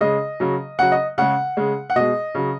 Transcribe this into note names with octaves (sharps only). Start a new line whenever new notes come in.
C#3 G#3 D#5
C#3 F#3
C#3 F#3 F#5
D#5
C#3 G#3 F#5
C#3 G#3
F#5
B2 G#3 D#5
C#3 F#3